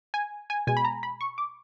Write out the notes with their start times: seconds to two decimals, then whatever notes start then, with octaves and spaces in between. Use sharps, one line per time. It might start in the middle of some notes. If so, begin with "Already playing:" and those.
0.14 G#5
0.50 G#5
0.67 B2 G#3 G#5
0.77 B5
0.85 A#5
1.03 B5
1.21 C#6
1.38 D6